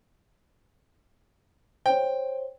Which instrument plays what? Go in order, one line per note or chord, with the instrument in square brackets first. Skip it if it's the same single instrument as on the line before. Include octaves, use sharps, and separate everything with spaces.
[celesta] C5 C#5 [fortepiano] G5